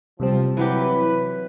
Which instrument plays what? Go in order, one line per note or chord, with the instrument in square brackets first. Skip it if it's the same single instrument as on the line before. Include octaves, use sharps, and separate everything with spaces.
[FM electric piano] C3 G3 C4 [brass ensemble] F3
[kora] E3 F#3 G4 [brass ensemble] B4